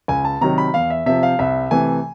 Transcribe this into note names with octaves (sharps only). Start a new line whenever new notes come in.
C#2 G#5
A5
C3 D#3 F#3 A#5
B5
E2 F5
E5
C3 F3 E5
F5
C2 E5
C3 E3 A3 G#5